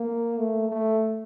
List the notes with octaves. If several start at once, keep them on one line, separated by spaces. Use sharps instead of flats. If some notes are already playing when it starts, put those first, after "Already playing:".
Already playing: A#3
A3
A3